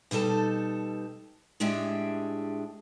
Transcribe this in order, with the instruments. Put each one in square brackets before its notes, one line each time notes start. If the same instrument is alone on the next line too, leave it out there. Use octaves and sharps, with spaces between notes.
[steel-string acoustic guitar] B2 G3 D#4 A4 A5
A2 G#3 D4 G4 G#4 E5